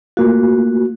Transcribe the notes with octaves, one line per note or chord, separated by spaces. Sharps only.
A3 A#3 F4 F#4